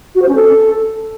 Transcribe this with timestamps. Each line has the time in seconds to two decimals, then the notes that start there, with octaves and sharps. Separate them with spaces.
0.15 F#4
0.22 C5
0.29 C#4
0.35 A4